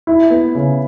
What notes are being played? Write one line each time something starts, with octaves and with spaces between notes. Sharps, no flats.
E4
B3
C#3